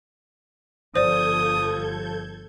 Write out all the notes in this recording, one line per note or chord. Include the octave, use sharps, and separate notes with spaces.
G1 F3 A4 C5 D5 D#6 G6 G#6